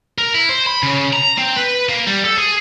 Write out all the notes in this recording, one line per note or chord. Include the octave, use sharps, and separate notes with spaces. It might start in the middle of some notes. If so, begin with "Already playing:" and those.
A#4
E4
C5
B5
C#3
A#5
C4
B4
A#3
G3
A4
G#4